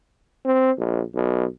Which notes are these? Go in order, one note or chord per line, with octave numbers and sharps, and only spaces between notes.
C4
A#1
B1